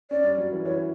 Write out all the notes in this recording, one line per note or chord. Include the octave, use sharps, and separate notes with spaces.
C#4 D5
G3
F#3
E3
E3 C#5